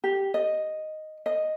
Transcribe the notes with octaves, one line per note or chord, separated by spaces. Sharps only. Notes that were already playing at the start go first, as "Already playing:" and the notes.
G4
D#5
D#5